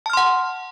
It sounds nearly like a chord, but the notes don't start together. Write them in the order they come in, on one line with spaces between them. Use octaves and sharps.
A5 F6 C6 F#5